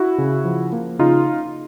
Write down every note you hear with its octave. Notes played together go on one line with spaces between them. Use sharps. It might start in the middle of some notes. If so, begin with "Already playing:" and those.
Already playing: E4 F#4
C#3
F3
A#3
C#3 D#4 F4